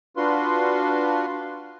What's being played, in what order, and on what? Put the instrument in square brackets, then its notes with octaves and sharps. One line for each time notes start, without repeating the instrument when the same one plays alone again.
[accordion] D4 F4 F#4 B4 C6